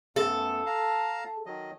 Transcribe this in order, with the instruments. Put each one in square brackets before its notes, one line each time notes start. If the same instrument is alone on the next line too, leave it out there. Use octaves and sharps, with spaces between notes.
[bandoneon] F#2 A3 B3 [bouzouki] A4
[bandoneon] F5 A5 A#5
D#3 F#3 D#5